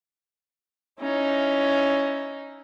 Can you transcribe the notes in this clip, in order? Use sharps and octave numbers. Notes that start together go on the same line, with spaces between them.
C#4 D#4 E4